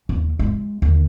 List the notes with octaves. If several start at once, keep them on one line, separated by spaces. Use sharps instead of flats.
D#2
G#3 F4
D#2 D3